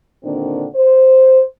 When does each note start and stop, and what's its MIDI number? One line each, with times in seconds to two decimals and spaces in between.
0.24 0.66 46
0.24 0.66 50
0.24 0.66 51
0.24 0.66 60
0.24 0.66 62
0.75 1.42 72